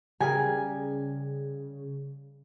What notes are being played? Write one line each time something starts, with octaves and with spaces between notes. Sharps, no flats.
C#3 G3 G#4 A#4 G#5